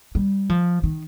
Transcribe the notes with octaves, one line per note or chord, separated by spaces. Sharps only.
G3
F3
D#3